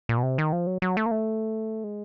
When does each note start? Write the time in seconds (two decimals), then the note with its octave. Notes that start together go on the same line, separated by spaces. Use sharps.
0.09 A#2
0.18 B2
0.23 C3
0.38 D#3
0.53 F3
0.67 F#3
0.82 F#3
0.97 A3
1.06 A#3
1.11 A3
1.84 G#3